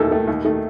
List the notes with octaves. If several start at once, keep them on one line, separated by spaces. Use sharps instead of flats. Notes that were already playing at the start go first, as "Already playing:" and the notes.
Already playing: D#2 A3 A4
D#3 A3
D#2
D#3 A3